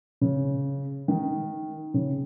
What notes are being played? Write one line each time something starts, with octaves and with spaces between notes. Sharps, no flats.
C#3
D#3
C#3